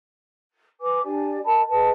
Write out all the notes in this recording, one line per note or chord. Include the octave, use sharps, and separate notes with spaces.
B4 G#5 D6
D4 G4 D5 G#5
A#4 D#5 A5 B5
G#4 B4 D#5 A5